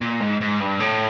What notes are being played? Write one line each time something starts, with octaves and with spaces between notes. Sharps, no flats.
A#2
G#2
G#2
G2
A2